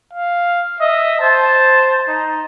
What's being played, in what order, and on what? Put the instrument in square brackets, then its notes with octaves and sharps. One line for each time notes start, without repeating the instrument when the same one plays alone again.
[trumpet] F5
[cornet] D#5 [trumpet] E5
[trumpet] C5 [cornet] A5
[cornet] D#4